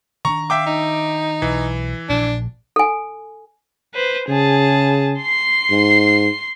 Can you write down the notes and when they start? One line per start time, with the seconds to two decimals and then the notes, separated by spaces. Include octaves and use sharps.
0.25 D#3 C#4 D4 A#5 C#6
0.50 E5 F5 G5 D6
0.66 D#4
1.42 B1 E3
2.09 A#1 D4
2.76 A4 G#5
3.94 B4 C5
4.28 C#3 G#4 A5
5.20 C6 C7
5.71 G#2